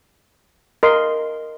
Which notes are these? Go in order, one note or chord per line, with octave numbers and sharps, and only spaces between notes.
A#4 D#5 C6